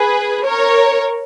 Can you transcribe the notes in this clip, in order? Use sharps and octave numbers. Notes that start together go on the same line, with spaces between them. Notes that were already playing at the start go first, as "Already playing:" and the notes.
Already playing: G#4 B4
A#4 C#5